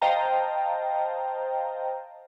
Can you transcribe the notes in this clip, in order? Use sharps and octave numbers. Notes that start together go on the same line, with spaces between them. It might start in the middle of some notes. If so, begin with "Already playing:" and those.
C5 D#5 F5 G5 A5 A#5